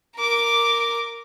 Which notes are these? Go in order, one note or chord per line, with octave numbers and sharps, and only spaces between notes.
A#4 D6